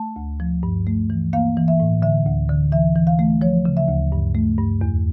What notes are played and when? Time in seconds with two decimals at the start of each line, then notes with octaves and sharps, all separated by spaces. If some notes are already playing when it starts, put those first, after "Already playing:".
Already playing: A3 A5
0.16 D2
0.40 F3
0.63 G2
0.87 A3
1.10 E3
1.33 A#3 F5
1.57 E3
1.68 E5
1.80 A2
2.02 D3 E5
2.26 D2
2.49 D3
2.72 E3 E5
2.96 E3
3.07 F5
3.19 A3
3.41 F3 C#5
3.65 C#3
3.77 E5
3.88 D2
4.12 G2
4.35 A3
4.58 G2
4.81 E2